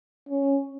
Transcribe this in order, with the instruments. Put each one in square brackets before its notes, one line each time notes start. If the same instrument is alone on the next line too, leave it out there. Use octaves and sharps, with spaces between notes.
[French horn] C#4